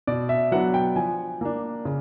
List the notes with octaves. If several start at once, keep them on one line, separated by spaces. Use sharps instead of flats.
B2 D5
E5
F#3 B3 D4 F#5
G5
F3 G#5
A#3 D4
C#3